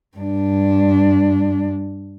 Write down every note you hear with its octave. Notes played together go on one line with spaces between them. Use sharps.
G2 D4